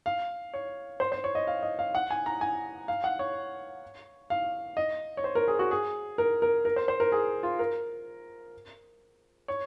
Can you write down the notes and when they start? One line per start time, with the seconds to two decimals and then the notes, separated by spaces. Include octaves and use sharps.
0.06 F5
0.54 C#5
1.00 C5
1.12 C5
1.24 C#5
1.35 D#5
1.47 F5
1.63 D#5
1.79 F5
1.95 F#5
2.11 G#5
2.26 A#5
2.41 G#5
2.88 F5
3.04 F#5
3.19 C#5
4.30 F5
4.77 D#5
5.17 C#5
5.24 C5
5.35 A#4
5.48 G#4
5.59 F#4
5.71 G#4
6.18 A#4
6.42 A#4
6.65 A#4
6.76 C5
6.88 C5
7.00 A#4
7.12 G#4
7.43 F4
7.59 A#4
9.48 C#5